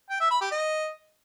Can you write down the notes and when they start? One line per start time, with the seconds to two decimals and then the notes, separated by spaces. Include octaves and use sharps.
0.10 G5
0.20 E5
0.31 B5
0.41 G4
0.52 D#5